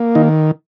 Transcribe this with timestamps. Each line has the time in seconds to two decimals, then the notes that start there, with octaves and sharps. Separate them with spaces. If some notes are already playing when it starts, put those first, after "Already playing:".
Already playing: A#3
0.15 D#3 D#4